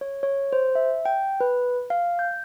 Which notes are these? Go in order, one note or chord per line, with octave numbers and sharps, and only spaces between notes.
C#5
C#5
C5
E5
G5
B4
F5
G6